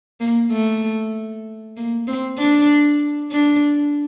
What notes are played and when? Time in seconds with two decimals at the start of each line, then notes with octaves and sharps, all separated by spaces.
0.20 A#3
0.51 A3
1.77 A#3
2.07 C4
2.38 D4
3.32 D4